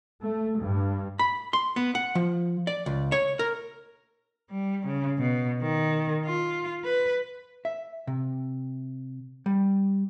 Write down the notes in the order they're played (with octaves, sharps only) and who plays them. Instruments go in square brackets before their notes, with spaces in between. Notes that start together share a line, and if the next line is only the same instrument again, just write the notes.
[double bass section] A3
G2
[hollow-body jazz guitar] B5
C6
B3
F#5
F3
D5
C#2
C#5
A#4
[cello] G3
C#3
B2
D#3
F4
B4
[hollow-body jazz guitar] E5
C3
G3